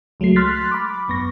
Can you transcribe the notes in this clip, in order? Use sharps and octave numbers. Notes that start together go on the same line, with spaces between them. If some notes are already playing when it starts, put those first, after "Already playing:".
C#2 F#3 G#3 A3 C7
C6 F6 F#6 A6 B6
B5 D6
G#1 F#2 B3 C#6 A#6